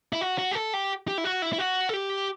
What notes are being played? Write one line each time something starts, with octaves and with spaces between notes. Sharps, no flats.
E4
F#4
F#4
G4
A4
G4
G4
E4
F#4
E4
E4
F#4
A4
G4